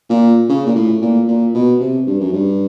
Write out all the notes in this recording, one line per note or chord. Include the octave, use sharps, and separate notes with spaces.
A#2
C#3
A#2
A2
A#2
A#2
B2
C3
G2
F#2
G2